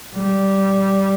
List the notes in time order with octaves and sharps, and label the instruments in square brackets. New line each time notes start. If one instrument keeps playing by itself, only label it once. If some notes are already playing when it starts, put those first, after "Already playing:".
[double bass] G3